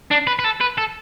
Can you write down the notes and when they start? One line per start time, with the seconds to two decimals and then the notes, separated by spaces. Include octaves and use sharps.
0.11 D4
0.27 B4
0.39 B4
0.44 A4
0.61 B4
0.78 A4